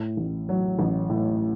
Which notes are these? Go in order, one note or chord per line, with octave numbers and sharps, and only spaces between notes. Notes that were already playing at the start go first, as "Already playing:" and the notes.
Already playing: A2
A1
F#3
A1
A2